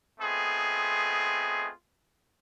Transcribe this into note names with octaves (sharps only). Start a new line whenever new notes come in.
A3 B3 C4 F4 G#4 D#5